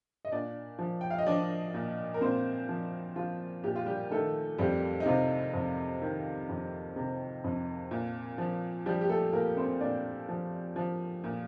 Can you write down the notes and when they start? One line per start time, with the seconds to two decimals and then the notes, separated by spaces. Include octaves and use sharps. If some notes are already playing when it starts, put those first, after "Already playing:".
0.25 D#5
0.32 A#2 D4 D5
0.79 F3
1.01 G5
1.11 F5
1.18 D#5
1.26 F3 D4 D5
1.74 A#2
2.14 A#4
2.21 A#2 C4 C5
2.69 F3
3.16 F3 F4
3.64 A#2 G4
3.76 F4
3.86 G3 G4
4.11 D#3 A3 A4
4.58 F2 G3 G4
5.00 D#4
5.06 C3 F4
5.54 F2
6.02 D#3
6.49 F2
6.96 C3
7.44 F2
7.91 A#2
8.38 F3
8.86 F3 G3 G4
9.01 G4
9.09 A3 A4
9.33 A#2 A#3 A#4
9.57 C4 C5
9.80 A#2 D4 D5
10.29 F3
10.76 F3
11.24 A#2